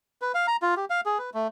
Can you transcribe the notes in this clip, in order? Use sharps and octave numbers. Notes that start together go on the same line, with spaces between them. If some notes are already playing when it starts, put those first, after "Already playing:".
B4
F5
A#5
F4
G4
F5
G#4
B4
A3